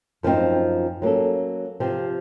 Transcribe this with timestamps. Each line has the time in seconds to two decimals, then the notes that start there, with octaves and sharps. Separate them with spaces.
0.23 F#2 F3 A3 C4 D#4
1.02 F#3 A#3 C#4 A4
1.80 C3 F3 C4